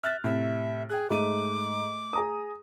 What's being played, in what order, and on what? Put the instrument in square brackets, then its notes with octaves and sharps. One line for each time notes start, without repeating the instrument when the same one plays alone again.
[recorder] E5 [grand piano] F6 F#6 A6
[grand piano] A2 C3 [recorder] E5
[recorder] G#4 [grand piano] G5 F#6
[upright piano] G#2 D#7 [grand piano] A3 [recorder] D6
[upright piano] G#4 A#5 D#6